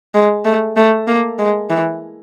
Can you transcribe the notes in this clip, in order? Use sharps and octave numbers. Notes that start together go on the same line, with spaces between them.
G#3
A3
A3
A#3
G#3
E3